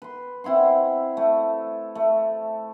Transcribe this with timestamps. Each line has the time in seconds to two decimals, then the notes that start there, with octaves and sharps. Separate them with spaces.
0.02 B4 C6
0.44 C4 E4 F#5 C6
1.17 A3
1.95 A3